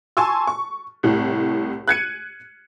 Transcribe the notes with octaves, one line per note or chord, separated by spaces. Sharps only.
G#5 A5 C6 C#6 E6
C#6
C2 A2
F#6 G#6 C#7 D#7